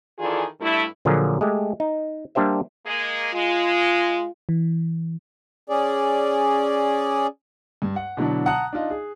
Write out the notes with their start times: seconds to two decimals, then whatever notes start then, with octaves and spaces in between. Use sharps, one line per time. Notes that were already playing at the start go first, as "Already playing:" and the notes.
0.19 D#3 E3 F4 G#4 A4 D5
0.61 G2 A3 E4
1.05 A#2 D3 F3 F#3 G#4 A#4
1.41 G#3 A3 G4
1.80 D#4
2.35 G3 A#3 D4 G4 C5 E5
2.86 G#3 A#3 G#4
3.34 G#3 F4
4.49 E3
5.70 C#4 G#4 D5
7.82 G2
7.96 F#5
8.17 B2 D3 E3 F#3 D4
8.46 F#5 A5 A#5 D#6 F#6
8.73 D4 D#4 F4 D#5
8.90 G#4